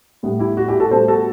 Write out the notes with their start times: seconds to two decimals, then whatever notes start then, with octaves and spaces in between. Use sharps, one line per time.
0.23 A2 G3 B3
0.39 E4 G4
0.57 F#4
0.68 E4 G4
0.80 F#4 A4
0.91 A2 G3 B3 A4 C5
1.08 F#4 A4